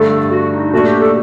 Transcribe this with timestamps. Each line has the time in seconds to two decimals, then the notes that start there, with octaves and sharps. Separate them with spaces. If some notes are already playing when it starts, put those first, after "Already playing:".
Already playing: G2 D3 A3 A4
0.31 F#4
0.53 D#4
0.73 A#2 A3 D4 F#4
0.87 G4
1.01 A4